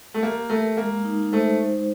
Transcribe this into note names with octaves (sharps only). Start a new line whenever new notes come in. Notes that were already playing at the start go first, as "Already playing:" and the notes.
A3
A#3 G4
A3 A#4
G#3 A#3
D#4
A3 C5